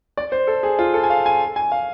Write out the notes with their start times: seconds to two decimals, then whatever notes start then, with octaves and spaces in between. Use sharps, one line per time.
0.17 D5
0.32 C5
0.47 A4
0.63 G#4
0.79 F4
0.94 A4
1.03 G#5
1.10 F5
1.26 G#5
1.56 G#5
1.72 F5